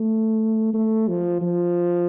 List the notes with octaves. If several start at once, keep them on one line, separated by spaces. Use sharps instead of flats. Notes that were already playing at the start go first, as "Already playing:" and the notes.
Already playing: A3
A3
F3
F3